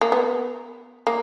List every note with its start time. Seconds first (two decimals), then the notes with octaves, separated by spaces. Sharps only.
0.01 A#3
0.12 B3
1.07 A#3